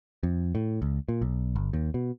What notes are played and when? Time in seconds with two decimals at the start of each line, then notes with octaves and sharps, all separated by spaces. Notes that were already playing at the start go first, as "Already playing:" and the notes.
0.23 F2
0.55 A2
0.82 C#2
1.09 A#2
1.22 B1
1.56 G1
1.73 D#2
1.94 B2